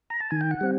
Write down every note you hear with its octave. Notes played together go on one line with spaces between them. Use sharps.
A#5
A5
D#3 G#5
G5
F#5
G3 C4